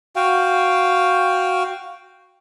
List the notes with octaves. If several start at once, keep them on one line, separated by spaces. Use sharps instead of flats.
F#4 F5 G5